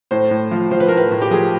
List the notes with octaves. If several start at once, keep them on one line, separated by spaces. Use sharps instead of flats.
A2 C5
A2
F3
F3 C5
B4
A2 A#4
B4
A2
G4
F3 G#4